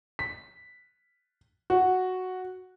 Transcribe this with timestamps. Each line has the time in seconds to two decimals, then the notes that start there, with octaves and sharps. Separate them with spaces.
0.19 B6
1.70 F#4